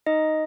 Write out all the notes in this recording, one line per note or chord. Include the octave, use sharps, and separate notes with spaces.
D#4 D#5